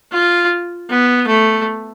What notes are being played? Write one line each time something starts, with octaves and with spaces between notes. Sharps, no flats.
F4
B3
A3